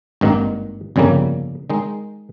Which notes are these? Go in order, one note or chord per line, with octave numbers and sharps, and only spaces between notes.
G#1 G2 D#3 A#3
G1 F2 C#3 G3 A#3
D#3 G#3 D#4